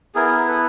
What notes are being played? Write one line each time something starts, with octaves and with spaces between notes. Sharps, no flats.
B3 E4 G#4 A#4
A4 B4